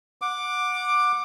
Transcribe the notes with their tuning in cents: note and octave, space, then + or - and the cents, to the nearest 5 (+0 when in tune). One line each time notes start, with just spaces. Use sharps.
F#5 -15 D6 +10